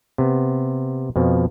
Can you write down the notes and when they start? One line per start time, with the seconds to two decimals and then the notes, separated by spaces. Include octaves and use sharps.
0.18 C3 B3
1.16 F2 B2 F3